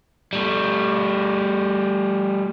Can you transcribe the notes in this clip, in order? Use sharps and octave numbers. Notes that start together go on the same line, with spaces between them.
G3 A3